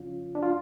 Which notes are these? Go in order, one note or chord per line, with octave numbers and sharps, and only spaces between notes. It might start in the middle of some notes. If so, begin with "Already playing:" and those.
Already playing: F2 C#3 F3 C#4 F4
D4
F4